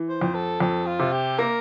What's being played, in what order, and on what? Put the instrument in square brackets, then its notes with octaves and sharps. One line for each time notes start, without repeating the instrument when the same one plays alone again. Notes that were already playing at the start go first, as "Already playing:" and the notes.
Already playing: [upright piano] E3
[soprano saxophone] C5
[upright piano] F2
[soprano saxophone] A4
[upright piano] F2 [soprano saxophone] A4
[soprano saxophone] F4
[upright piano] C3
[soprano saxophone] G4
[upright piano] A#3 [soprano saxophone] A#4